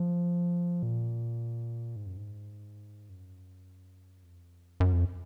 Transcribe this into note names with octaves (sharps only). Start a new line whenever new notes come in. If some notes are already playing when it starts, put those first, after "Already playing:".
Already playing: F3
A#2
G#2
F#2
G#2
F#2
F2
F#2
F2